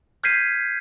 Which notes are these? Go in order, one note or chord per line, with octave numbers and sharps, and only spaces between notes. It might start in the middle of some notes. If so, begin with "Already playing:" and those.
F6 G6 G#6 B6 C7 D#7